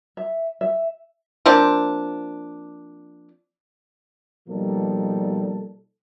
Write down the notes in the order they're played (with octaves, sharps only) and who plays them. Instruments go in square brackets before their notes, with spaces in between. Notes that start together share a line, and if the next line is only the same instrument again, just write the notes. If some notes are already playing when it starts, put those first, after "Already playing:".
[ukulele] E5
E5
[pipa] F3 A#3 C4 D4
[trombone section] B2 F3 G3 A#3 D#4 A4